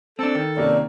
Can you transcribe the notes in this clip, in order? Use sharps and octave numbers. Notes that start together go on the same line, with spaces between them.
C4 D4 A4
D#3
C3 A#3 C#4 D5